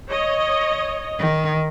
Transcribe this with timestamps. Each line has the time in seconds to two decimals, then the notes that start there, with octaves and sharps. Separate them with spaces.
0.10 C#5 D#5
1.19 D#3